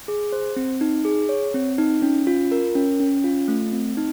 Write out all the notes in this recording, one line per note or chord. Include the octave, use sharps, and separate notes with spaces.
G#4
C5
C4
D#4
G#4
C#5
C4
D#4
C#4
F4
A#4
C#4
C#4
F4
A3
C4
D#4